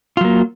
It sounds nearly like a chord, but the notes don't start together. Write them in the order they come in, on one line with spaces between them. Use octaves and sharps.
F4 F#3 A#3